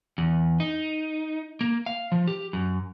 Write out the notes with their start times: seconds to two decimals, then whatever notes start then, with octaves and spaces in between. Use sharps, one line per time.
0.18 E2
0.60 D#4
1.61 A#3
1.86 F5
2.12 F3
2.28 G4
2.53 F#2